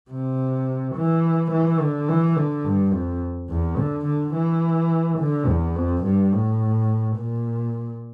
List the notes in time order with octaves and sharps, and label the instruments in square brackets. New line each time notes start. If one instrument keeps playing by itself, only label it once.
[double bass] C3
E3
E3
D3
E3
D3
G2
F2
E2
D3
D3
E3
D3
E2
F2
G2
A2
A#2